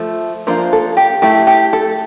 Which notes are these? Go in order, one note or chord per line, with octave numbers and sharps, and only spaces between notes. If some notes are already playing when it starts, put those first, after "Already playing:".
Already playing: F3 A3
F3 A#3 D4 F4 C5
A4
G4
A3 E4 G4
G4
A4